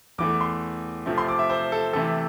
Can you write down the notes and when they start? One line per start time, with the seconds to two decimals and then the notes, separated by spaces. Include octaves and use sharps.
0.18 E2 E3 A3 D6
0.41 C6
1.06 C3 F3 A3 C4
1.18 C6
1.28 D6
1.39 E5
1.50 C5
1.72 A4
1.93 C3 E3 A3 A4